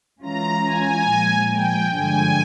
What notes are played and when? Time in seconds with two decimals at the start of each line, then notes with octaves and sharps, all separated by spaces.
0.23 E3 G#3 C#4 F4 A#5
0.66 G#5
1.10 A#2 F3 G#3
1.53 G5
1.96 G2 D3 F3 G#3 G#5